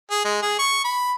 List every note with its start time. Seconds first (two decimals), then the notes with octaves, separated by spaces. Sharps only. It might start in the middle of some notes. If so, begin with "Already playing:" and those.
0.11 G#4
0.24 G#3
0.42 G#4
0.59 C#6
0.84 B5